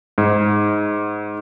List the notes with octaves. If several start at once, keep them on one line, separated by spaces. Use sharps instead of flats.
G#2